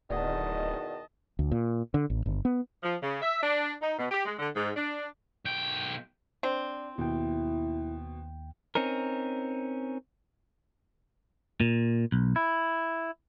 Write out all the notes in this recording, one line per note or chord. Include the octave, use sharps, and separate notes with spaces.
D1 E2 B2 D#3 D5 D#5 F#5 A5
D2
A#2
D3
A1
G1
B3
F3
C#3
E5
D4
D#4
B2
G4
G#3
D3
G#2
D4
B1 G5
C4 D4
D#2 B2 E4 G5
C4 C#4 D#4 A#4
A#2
B1
E4